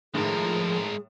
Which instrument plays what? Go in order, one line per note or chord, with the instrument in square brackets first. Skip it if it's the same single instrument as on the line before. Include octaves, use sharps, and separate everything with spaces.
[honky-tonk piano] A2 D#3 [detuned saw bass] F3 [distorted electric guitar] G#3 A#4 [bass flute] G#4